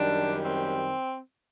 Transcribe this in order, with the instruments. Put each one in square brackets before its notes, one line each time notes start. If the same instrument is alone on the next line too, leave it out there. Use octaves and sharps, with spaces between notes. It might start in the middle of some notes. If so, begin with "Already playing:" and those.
Already playing: [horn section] F#2 D#3 G3 D4
C4